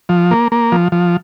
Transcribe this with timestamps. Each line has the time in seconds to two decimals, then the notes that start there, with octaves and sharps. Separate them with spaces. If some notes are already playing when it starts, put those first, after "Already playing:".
0.09 F3
0.31 A#3
0.52 A#3
0.72 F3
0.92 F3